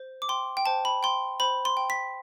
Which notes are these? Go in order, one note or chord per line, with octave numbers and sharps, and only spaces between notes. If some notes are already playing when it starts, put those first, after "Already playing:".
Already playing: C5
D6
G5 C6
G5
C5 A5
B5
G5 C6
C5 B5
C6
G5
B6